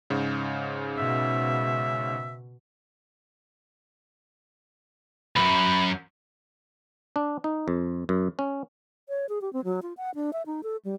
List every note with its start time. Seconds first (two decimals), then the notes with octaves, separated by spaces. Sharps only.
0.10 G#2 C#3
0.98 B2 E5
5.36 C#2 F#2 B5
7.16 D4
7.44 D#4
7.68 F2
8.09 F#2
8.39 C#4
9.08 C#5
9.29 G#4
9.42 G4
9.53 C4
9.64 F#3
9.82 F4
9.97 F#5
10.15 D4
10.33 E5
10.46 D#4
10.63 A4
10.85 G3